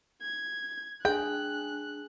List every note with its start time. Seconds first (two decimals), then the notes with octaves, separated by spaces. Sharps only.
0.22 G#6
1.05 D4 G#4 G5 F#6